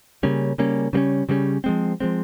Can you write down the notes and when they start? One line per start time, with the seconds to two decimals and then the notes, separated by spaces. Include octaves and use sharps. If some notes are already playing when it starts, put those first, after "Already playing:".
0.23 C#3 G3 A#3 C#4
0.58 C#3 G3 A#3 C#4
0.93 C#3 G3 A#3 C#4
1.29 C#3 G3 A#3 C#4
1.64 F3 G#3 C4
2.00 F3 G#3 C4